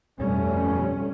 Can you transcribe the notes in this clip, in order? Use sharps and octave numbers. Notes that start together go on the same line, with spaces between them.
G1 F2 B2 G3 A3 C#4